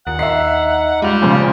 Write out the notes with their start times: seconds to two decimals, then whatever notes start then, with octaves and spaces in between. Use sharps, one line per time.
0.07 D#2 A#2 F#5
0.19 D#4 E5 C7
1.02 G2 G3 G#3 F4 F7
1.22 A#2 C#3 F3